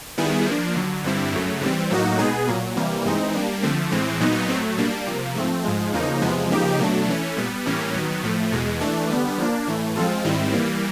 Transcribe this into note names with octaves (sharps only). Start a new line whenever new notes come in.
D#3 G3 B3 E4 G#4
F3 A#3 D4
D#2 D3 F#3
G2 D3 G3 C4 E4
F#2 C#3 F#3 A3
G#2 E3 G3 C4
A2 F#3 A#3 D#4 F#4
B2 G#3 B3 D#4 G#4
A#2 F#3 A#3
C3 E3 G3 A#3
G2 E3 G#3 C4 D#4
G3 A#3 D4
D3 F3 A3 C4
A2 E3 G#3 C4
A#2 F#3 B3 D#4
A2 F#3 A3 C4
B2 G3 A#3 D4
C3 F3 A#3
G#2 F3 A3 C4
G#2 F3 G#3
E2 C#3 F3 A#3 D#4
E2 C3 F3 G#3 B3
C#3 F3 A#3 D#4 G4
B2 F#3 A3 D4
E3 A3 C#4
A#2 G3 B3
A2 E3 G3 A#3 C#4
D#3 F#3 B3
A2 F3 A3
E2 B2 G#3
E3 A3 D4
D3 G3 B3
F3 A#3 D4
A2 E3 A3
F3 G#3 C4 F4 A4
G#2 D#3 G3 C4 E4
E3 G3 A#3